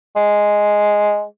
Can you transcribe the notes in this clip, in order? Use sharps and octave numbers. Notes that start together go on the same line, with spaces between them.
G#3